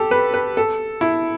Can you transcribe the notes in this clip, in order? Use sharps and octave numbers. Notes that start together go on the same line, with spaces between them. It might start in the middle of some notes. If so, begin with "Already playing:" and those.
Already playing: G4 A4
B4
B4
A4
E4